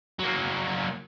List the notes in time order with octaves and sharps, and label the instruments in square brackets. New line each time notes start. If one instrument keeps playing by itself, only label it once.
[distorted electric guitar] F#3 A#3